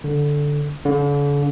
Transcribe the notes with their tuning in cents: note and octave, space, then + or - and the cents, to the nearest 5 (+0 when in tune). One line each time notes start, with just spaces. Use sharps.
D3 -5
D3 -40